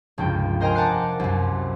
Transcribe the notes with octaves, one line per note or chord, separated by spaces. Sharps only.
F1 C#2 G2 G5
A#4 C5 D#5 G5 G#5 A#5
F#5 A5 A#5 D6 F#6 C7
C2 F#2